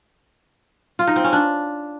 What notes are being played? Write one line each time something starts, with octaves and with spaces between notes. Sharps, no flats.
F4
D#4
C4
C#4
D4